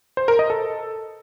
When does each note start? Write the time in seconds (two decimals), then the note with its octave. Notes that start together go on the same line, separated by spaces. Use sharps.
0.17 C5
0.28 A#4
0.39 D#5
0.50 A4